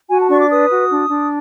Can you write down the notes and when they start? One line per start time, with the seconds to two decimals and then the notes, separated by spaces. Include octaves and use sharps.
0.09 F#4 G#5
0.20 A5
0.29 D4 C#6
0.40 D6
0.49 B4 D#6
0.70 F#4
0.90 D4
1.10 D4